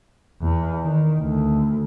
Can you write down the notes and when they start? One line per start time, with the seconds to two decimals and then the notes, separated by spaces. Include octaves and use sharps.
0.42 E2
0.83 D#3
1.21 D2